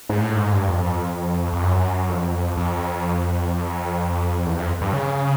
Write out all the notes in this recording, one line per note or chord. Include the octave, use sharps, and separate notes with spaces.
G#2
A2
G#2
G2
F2
F2
F#2
F2
F2
E2
F2
G2
C#3